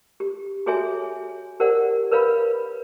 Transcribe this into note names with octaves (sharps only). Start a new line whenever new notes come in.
G4
F#4 G#4 A4 C#5 E5 G#5
G4 A#4 C5 D5 F#5
A#4 B4 C#5 F5 B5